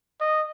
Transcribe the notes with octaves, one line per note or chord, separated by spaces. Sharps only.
D#5